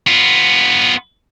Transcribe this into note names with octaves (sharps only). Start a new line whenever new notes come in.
B3 F4